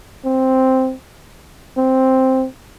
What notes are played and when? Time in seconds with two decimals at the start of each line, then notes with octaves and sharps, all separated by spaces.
0.25 C4
1.78 C4